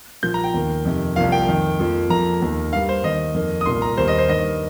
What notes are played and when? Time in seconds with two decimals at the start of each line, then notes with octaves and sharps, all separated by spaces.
0.23 A#2 F3 A#3 G6
0.34 A#5
0.44 G5
0.54 D#2 D#3 A#3
0.85 F2 C3 D#3
1.16 C2 C3 F3 A#3 F5
1.32 G5
1.48 F2 D#3 A#3
1.79 F2 F3 A#3
2.10 F2 F3 A#3 A#5
2.42 D#2 D#3 A#3
2.72 G2 G3 A#3 F5
2.89 C5
3.03 D#2 D#3 A#3 D#5
3.34 F2 D#3 A#3
3.61 D#6
3.66 C2 A#2 A#3 C6
3.82 A#5
3.97 D#2 D#3 G3 A#3 C5
4.08 D#5
4.18 C5
4.28 G2 D#3 A#3 D#5